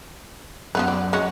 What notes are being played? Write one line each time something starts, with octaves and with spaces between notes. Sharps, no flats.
F#2 F3 B3 B4
D5
G#3 C#4 F#4